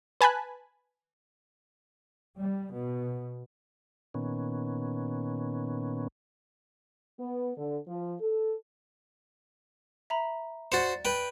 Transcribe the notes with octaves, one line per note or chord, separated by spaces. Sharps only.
B4 G#5 A5 B5 F#6
G3
B2
A#2 D#3 B3 C#4
B3
D3
F3
A4
E5 A#5 B5
F#4 C5 D5 A6 C#7
B4 G5